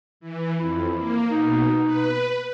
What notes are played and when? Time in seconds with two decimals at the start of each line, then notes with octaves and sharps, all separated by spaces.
0.20 E3
0.59 F2 E4
0.96 A#3
1.30 B2 D#4
1.84 B4